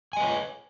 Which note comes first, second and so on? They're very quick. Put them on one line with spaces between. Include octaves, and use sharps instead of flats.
G#5 D#5 B4 C#5